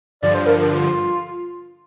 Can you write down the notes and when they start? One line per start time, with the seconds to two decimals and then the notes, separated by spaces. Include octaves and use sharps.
0.23 G2 D3 F3 D5
0.35 C5
0.47 A#4
0.69 F4